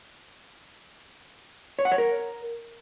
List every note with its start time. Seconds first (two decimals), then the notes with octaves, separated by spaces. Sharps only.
1.79 C#5
1.85 F#5
1.92 C#5
1.98 A#4